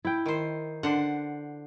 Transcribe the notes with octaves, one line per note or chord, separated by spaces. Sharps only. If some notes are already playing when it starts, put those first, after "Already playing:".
E4 G5
D#3 C5
D3 D4 C5 F#5